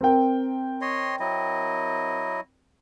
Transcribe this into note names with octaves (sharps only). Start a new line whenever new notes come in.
C4 A#4 G5
C#5 D#5 C6
F#3 E4 D#5